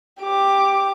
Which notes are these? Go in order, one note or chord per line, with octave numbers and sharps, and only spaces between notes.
G4 D6